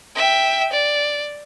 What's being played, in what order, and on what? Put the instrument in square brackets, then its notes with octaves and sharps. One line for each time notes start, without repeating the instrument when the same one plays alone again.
[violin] E5 G5
D5